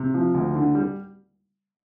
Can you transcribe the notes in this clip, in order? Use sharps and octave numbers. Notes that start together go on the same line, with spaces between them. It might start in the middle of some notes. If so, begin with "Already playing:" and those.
Already playing: C3
F3
D2
D3
G3